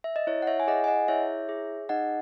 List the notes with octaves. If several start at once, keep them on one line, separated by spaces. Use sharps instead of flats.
E5
D#5
E4 C#5
F#5
C#5 E5
G#5
G#4 D#5 F#5
G#5
D#5 F#5
E4 C#5 E5
G#4
D#4 D#5 F#5